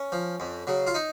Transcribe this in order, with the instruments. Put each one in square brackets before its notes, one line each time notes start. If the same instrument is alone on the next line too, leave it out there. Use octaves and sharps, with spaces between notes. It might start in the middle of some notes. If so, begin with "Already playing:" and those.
Already playing: [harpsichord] C#4
F3
F2
C#3 F#3
F4
D#4